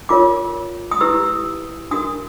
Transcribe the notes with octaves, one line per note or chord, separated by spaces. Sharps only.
F4 A#4 C#5 D6
D#6
E4 G4 B4 E6
D4 F#4 A#4 D#6